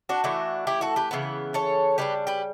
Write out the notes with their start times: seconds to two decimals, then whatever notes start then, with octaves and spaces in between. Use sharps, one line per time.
0.09 D4 F#4
0.24 E3 A3 D4
0.67 E4 G4
0.81 F#4 A4
0.96 G4 B4
1.11 C#3 E3 B3
1.54 A4 C#5
1.98 C#3 G3 D4 G4 B4
2.27 G4 B4